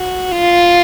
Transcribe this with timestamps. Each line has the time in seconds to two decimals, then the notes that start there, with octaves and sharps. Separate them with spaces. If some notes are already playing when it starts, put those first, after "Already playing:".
Already playing: F#4
0.31 F4